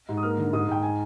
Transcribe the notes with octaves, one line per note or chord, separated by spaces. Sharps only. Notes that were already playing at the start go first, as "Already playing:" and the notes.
G#2
D#6
A#3 F6
D3
G#2 D#6
G#2 G5
G#5